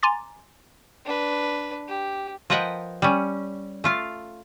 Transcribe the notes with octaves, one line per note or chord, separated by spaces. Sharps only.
G#5 A#5 C6 D6 A6
D4 B4
G4
F3 A#4 B4 D#5 F#5 G5
G3 C#4
A3 F4 F5